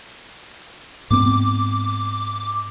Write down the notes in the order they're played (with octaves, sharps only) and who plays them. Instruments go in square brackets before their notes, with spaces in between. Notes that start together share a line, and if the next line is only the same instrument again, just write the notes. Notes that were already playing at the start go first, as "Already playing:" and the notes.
[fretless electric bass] G#2 B3 C4 [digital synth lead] D6